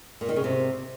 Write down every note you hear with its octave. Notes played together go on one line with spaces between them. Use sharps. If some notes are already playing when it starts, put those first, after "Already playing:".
A#2
D#3
C#3
C3